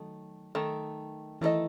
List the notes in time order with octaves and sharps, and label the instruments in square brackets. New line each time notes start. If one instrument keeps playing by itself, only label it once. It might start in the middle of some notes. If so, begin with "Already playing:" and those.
Already playing: [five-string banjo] D#3 A3 [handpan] F#3
[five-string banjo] D#3 A3
[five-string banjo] D#3 A3 D#4 A4 D#5 [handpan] E3 E4